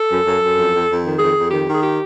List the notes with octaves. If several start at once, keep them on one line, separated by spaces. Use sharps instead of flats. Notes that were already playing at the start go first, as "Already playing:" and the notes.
Already playing: A4
F#2
F#2
F#2
F2
F2
F2
D#3
F2 G#4
F2
D#3 G4
D#3
G#4
G4